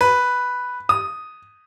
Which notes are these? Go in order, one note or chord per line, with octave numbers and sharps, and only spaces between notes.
B4
D#6